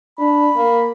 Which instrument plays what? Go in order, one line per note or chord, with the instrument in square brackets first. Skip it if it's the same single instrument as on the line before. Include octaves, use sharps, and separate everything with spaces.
[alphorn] D4 [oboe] B5
[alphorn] A#3